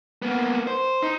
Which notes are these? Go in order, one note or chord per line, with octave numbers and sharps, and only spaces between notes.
A#3 B3
C5
D#4